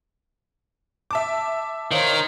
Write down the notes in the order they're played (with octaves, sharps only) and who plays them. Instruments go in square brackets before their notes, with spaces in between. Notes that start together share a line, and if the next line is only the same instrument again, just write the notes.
[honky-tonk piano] E5 A5 D6
[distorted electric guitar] D#3 [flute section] C5 C#5 A#5 [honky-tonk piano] F5